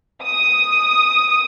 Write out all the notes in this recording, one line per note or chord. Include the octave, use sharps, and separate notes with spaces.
D#6